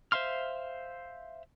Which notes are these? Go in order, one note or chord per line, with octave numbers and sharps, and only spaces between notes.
C5 E5 F5 C6 F6